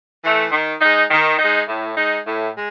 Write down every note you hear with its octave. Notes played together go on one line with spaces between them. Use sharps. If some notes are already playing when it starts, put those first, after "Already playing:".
E3 A3
D#3
G#3 D#4
D#3
G#3 D#4
A2
G#3 D#4
A2
G#3